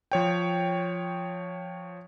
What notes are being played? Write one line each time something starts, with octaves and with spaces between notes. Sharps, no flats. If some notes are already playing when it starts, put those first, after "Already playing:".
F3 C#5 G5